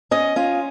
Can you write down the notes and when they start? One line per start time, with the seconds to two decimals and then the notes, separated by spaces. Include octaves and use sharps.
0.11 C#4 D#5
0.36 C#4 F4